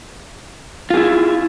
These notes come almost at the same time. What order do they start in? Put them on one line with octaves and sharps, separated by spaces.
F4 G#4 E4